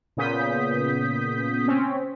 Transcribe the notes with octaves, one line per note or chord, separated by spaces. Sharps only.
A#2 C#3 B3 D#6 G6 B6
C4 C#4